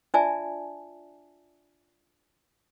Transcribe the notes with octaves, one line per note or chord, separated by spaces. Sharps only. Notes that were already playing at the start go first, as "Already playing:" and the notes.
D4 F4 D5 E5 G#5 A5